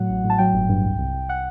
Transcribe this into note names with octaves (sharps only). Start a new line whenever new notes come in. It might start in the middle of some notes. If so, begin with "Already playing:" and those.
Already playing: A2 F#3 F#5
A1
A2
A5
F#3 G5
G1
G2
C2
C2
C2
F#5